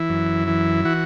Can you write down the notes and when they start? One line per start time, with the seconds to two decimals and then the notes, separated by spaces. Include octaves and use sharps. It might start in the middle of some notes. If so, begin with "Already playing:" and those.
Already playing: E3 E4
0.09 F#2
0.47 E3
0.85 E3 F#4